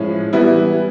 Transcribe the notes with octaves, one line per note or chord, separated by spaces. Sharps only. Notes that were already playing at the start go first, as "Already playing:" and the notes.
Already playing: A2 F3 G#3 C#4
E3 G3 B3 E4